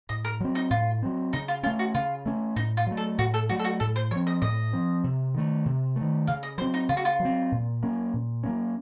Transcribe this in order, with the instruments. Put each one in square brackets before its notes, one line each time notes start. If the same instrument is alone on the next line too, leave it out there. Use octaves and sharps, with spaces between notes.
[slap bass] A2 [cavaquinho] D#5
[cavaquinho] A#4
[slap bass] F#3 C4
[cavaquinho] D#4
[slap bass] A2 [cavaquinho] F4
[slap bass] F#3 C4
[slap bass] C#3 [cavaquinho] D#4
[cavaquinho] F4
[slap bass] C#4 [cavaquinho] F4
[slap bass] A3
[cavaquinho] F#4
[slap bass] C#3 [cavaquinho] F4
[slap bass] A3 C#4
[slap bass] A2 [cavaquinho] D#4
[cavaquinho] F4
[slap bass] F#3 A3
[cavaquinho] A4
[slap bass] A2 [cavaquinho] F#4
[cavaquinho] A4
[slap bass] F#3 A3 [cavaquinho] F#4
[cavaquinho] A4
F#4
[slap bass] A2 [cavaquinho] A4
[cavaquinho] C5
[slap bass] F3 C4 [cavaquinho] C#5
[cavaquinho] D#5
[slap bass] A2 [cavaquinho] D#5
[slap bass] F3 C4
C3
D#3 A3
C3
A3
D#3
[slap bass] C#3 [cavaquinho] F5
[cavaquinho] D#5
[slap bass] F#3 [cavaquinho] C5
[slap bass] C4
[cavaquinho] D#4
[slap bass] C#3 [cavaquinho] F4
[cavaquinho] F#4
F4
[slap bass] F#3
C4
A#2
F#3 A#3 C#4
A#2
F#3 A#3 C#4